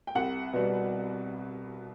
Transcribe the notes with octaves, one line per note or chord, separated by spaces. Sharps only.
G5
C2 F#5
B2 G3